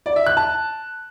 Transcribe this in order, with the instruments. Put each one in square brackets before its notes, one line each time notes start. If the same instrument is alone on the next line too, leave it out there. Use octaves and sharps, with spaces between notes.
[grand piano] D5
E5
F#6
A5